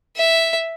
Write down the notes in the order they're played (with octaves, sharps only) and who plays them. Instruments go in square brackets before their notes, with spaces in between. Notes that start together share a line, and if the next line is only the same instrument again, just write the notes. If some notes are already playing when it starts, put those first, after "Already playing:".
[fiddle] E5